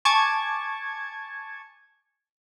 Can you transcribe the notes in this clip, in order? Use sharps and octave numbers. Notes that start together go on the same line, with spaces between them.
G#5 A5 C#6 D6 G#6